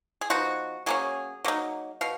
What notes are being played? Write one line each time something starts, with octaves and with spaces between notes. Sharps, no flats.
G#4
F3 B3 D#4 F#4
F#3 A#3 C#4 G#4
F#3 A#3 D#4
B2 F5